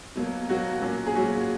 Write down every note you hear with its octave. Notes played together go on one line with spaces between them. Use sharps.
B2 F#3 A#3
B2 F#3 A#3 F#4
A#2 F#3 C#4
G#4
A#2 F#3 C#4 F#4